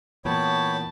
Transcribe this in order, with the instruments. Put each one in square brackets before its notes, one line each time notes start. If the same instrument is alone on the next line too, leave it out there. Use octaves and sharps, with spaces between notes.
[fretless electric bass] E2 A#2 [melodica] B3 G5 B5 [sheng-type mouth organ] C#5 [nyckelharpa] A5